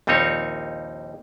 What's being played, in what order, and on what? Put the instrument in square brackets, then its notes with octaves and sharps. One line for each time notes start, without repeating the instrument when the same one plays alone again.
[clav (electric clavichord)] A#1 D#2 G3 C4 D#4 C#5